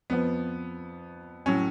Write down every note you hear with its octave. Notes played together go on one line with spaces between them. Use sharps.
F2 F3 B3
A2 F#3 C#4